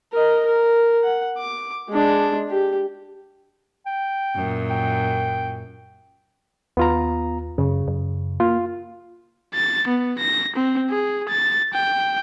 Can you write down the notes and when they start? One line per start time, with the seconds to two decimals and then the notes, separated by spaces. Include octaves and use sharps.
0.13 A#4 D#5
0.45 A#4
1.03 F#5
1.38 D6
1.89 G#3 D4
2.50 G4
3.86 G5
4.35 F#2 A#2
4.70 G5
6.77 D#2 B3 F4 A#5
7.58 F#2 C#3
7.88 F#2
8.40 A#3 F4
9.55 A6
9.88 B3
10.19 A#6
10.56 C4
10.90 G#4
11.29 A6
11.74 G5